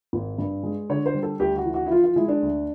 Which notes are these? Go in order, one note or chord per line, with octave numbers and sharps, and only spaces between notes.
G#1
G2
G#3
D3 C#5
C5
G3
A4
D2 G4
F#4
E3
F#4
E4
F3 F4
F4
G#3 E4
D4
D2